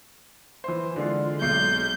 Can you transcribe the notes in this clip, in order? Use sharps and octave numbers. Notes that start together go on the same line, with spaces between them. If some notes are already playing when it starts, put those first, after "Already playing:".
E3 C5
D3 G#3 F4
B1 G#3 G6 C7